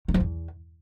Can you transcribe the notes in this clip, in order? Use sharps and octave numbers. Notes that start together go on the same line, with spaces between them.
D#3
F3
E2